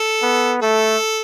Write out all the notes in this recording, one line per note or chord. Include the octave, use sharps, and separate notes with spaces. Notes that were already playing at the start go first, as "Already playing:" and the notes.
Already playing: A4
B3
A3 A4